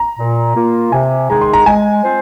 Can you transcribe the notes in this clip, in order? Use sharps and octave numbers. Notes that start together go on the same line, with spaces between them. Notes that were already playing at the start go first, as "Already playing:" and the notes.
Already playing: A#5
A#2
A#3 F4
C3 G#5
D#3 G#3 D#4 G#4 A#5
C6
A#5
G#3 G#5
C4 F4 C5